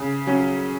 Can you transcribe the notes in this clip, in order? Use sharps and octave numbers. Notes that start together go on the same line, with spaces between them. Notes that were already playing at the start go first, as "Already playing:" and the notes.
Already playing: C#3
F#3 C#4